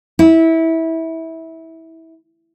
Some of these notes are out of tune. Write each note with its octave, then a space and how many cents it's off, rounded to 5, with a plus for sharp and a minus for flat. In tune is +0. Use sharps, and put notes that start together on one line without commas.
E4 -20